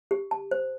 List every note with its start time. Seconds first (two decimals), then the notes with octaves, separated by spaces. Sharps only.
0.11 G4
0.31 A5
0.51 C5